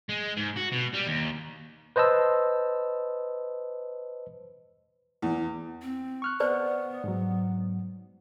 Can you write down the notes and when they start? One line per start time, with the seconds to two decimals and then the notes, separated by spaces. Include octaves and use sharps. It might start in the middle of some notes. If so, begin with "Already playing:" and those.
0.10 G#3
0.37 G#2
0.56 F#4
0.72 B2
0.94 G3
1.06 D#2
1.96 B4 C5 D#5 A5 E6
5.22 E2
5.82 C4
6.22 C#6 F6 F#6
6.40 B3 B4 C5 D5
7.04 G#2 F#3